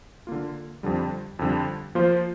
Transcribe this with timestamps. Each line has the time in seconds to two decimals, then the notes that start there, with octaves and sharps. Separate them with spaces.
0.27 D3 A#3 F4
0.83 F2 D3 G3
1.39 F2 D3 G3
1.95 F3 A#3 F4 C5